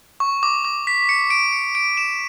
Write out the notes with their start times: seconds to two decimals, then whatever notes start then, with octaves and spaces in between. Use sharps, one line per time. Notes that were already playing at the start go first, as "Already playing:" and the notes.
0.20 C#6
0.43 D6
0.65 D6
0.87 B6
1.09 C#7
1.30 D7
1.53 C#7
1.75 D7
1.97 E7